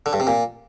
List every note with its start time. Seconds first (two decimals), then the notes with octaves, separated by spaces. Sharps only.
0.06 D3
0.13 G2
0.20 C3
0.27 A#2